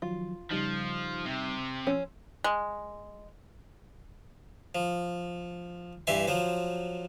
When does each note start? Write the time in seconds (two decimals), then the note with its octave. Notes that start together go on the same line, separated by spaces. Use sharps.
0.02 D#3 F3 F#3 F4
0.51 C#3 F3 G3 D#4
1.26 C3
1.87 F3 C#4 C6 E6
2.44 G#3
4.75 F3
6.07 G2 E3 G4 E5 C6
6.27 F3 F#3 C5